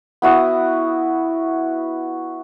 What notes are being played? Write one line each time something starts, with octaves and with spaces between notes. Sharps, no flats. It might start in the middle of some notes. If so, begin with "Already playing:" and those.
B3 E4 F#4 D#6